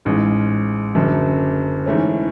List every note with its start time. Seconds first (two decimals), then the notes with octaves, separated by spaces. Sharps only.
0.05 A1 G#2 G#3
0.95 F#1 F#2 D3
1.86 G#2 E3 A3 C#4